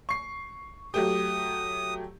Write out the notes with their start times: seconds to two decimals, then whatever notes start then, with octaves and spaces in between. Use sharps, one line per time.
0.09 C#6 C7
0.94 F#3 A3 G4 D#6